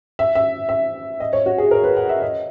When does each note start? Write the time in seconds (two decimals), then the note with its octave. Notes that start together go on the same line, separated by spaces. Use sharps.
0.19 E5
0.35 E5
0.69 E5
1.20 D#5
1.33 C#5
1.46 F#4
1.58 G#4
1.71 A#4
1.84 B4
1.97 F#5
2.09 E5
2.22 D#5